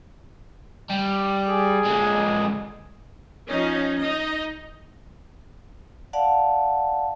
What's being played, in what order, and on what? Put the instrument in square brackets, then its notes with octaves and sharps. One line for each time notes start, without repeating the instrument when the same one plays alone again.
[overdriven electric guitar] G3
[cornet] G#4
[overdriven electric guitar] D3 G#3
[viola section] F3 C#4 D#4
D#4 D#5
[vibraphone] D5 F5 F#5 A5